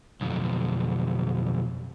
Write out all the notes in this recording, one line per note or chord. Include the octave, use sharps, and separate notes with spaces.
B1 F2